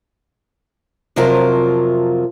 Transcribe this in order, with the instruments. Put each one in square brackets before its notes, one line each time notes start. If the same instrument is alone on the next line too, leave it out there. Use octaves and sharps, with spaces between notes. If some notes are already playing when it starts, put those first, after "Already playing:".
[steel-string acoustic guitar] F2 C3 F3 F#3 F4 A#4